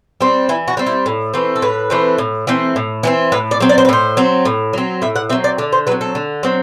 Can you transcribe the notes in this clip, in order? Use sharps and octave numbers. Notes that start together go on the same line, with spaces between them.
G3 C4
E3 E4
F#4
G3 C4
E4
A2
E3 A3 C4
A4
A2 B4
E3 A3 C4
A2
E3 A3 C4
A2
E3 A3 C4
A2 B4
D5
F#3 C4
D5
C5
B4
A2 C5
F#3 C4
A2
F#3 C4
A2 E5
F#5
F#3 C4 E5
D5
D3 D5
C5
F#3 C4 B4
A4
D3
F#3 C4